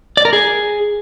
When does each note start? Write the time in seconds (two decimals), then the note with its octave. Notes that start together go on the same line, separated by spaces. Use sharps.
0.17 D5
0.25 A#4
0.33 G#4